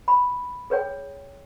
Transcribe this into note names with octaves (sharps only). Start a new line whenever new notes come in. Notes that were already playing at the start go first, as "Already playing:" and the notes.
B5
G#4 B4 C#5 G5